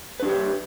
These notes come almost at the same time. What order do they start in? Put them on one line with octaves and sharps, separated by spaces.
B4 D4 G4 C#5